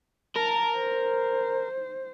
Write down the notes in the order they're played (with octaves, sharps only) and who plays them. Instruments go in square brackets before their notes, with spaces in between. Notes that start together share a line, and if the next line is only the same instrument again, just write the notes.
[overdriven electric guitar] A#4 [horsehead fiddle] A5
[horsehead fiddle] C5